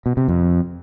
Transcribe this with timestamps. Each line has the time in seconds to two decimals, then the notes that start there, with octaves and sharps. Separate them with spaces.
0.06 B2
0.17 C3
0.28 F2